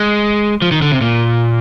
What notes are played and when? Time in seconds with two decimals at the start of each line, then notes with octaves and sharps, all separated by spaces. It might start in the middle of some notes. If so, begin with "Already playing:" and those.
Already playing: G#3
0.62 F3
0.71 D#3
0.82 D3
0.92 C3
1.01 A#2